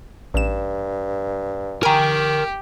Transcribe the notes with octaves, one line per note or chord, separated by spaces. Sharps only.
A1 G2 E7
G4 A#4 G5 G#5 A#5